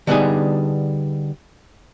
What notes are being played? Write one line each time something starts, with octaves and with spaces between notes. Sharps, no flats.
D3 G3 B3 D4 D#4 G#4